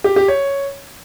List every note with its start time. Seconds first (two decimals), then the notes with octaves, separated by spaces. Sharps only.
0.04 G4
0.16 G4
0.28 C#5